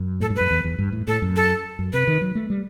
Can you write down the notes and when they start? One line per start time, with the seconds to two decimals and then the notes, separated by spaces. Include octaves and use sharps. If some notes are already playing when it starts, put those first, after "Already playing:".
Already playing: F#2
0.20 A2 A4
0.30 G2
0.36 F#2 B4
0.51 E2
0.65 E2
0.79 G2
0.92 A2
1.07 A2 A4
1.22 F#2
1.36 A4
1.79 F#2
1.93 C3 B4
2.07 D#3
2.21 F#3
2.35 A3
2.50 G3